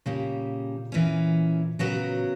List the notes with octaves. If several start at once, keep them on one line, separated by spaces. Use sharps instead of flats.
A#2 C#3 G3 A#3
E3 A#3 C#4
A#2 C#3 F#3 B3 F#4 A#4